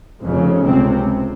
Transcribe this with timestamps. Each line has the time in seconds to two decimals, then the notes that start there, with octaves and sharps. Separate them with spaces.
0.23 F1 F2 C#3
0.65 C#2 C3 C4